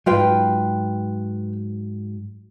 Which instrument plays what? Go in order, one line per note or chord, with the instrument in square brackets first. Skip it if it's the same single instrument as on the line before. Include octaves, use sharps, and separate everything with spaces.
[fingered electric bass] G#2 F#3 [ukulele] F4 B4 G5